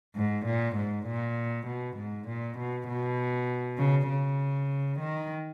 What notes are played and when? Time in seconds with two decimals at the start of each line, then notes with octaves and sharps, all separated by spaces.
0.16 G#2
0.46 A#2
0.76 G#2
1.07 A#2
1.67 B2
1.97 G#2
2.28 A#2
2.58 B2
2.88 B2
3.78 C#3
4.09 C#3
4.99 D#3